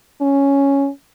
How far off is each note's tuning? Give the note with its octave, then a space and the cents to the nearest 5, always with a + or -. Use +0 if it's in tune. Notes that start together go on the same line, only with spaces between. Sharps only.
C#4 +0